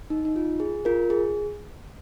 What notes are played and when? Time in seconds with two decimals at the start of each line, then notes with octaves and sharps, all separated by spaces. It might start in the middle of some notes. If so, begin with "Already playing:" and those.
0.10 D#4
0.25 D#4
0.36 F4
0.60 G#4
0.85 F4 A#4
1.10 G#4